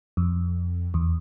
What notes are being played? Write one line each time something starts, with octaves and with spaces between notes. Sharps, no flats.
F2
E2